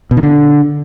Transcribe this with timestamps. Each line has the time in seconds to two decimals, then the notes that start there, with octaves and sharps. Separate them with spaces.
0.11 B2
0.17 D#3
0.23 D3